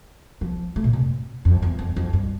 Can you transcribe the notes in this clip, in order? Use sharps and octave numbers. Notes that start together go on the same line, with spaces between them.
F3
A3
A#2
C#3
F2
F2
E2
F2
F2
G2